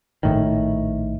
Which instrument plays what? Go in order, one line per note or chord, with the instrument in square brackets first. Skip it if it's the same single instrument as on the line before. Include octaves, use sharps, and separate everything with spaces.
[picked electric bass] A#1 A2 D#3